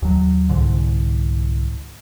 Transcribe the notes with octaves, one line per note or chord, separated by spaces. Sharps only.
D#2 F#3
C2 G#2 D3